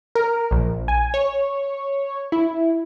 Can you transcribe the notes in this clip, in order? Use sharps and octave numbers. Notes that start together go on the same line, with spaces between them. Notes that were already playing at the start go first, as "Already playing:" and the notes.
A#4
A#1
G#5
C#5
E4